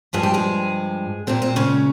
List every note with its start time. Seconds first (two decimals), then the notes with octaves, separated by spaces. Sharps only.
0.13 G2 F3 G#3 G#4
0.23 G4
0.34 G#3 G#4
1.27 A#2 G#3 C4
1.42 C4
1.56 C#3 C#4